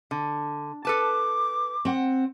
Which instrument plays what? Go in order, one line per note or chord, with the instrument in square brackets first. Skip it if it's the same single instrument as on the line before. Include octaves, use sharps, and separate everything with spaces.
[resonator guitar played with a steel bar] D3
[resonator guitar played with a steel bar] A4 B4 A5 [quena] D6
[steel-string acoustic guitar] C4 F#5